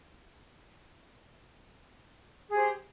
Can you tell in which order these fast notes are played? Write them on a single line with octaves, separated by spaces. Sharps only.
G#4 G4 C5